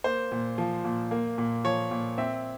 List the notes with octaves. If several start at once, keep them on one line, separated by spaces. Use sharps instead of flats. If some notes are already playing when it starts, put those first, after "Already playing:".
A#3 C5
A#2
F3
A#2
A#3
A#2
F3 C#5
A#2
C4 E5